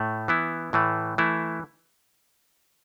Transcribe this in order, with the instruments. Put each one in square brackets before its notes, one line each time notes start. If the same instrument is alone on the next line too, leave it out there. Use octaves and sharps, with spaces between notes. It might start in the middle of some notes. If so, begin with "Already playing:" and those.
Already playing: [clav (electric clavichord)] A2 A3
E3 B3 E4
A2 E3 A3
E3 A3 E4